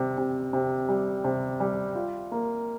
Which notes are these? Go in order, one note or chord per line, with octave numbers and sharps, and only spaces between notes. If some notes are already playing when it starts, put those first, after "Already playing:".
Already playing: C3 G3
C3
C3
G3
C3
G3
F4
A#3